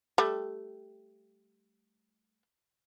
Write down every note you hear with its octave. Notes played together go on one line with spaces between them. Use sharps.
G3 A3